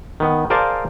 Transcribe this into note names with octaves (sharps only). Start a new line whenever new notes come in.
D#3 B3
G#4 A#4 C5 D5 F5 A5